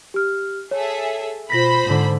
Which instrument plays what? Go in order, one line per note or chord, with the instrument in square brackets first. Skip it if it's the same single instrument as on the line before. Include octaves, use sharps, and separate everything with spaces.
[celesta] G4 F6
[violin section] G#4 A4 E5 [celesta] C#5
[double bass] B2 [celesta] F4 A#6 B6 [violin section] C5 B5
[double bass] G#2 D3